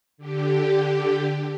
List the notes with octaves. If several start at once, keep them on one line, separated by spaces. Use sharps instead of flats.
D3 G4